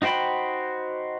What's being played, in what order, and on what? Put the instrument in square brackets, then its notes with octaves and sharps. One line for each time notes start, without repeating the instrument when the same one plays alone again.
[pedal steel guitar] D#4 F#4 C5 G5 B5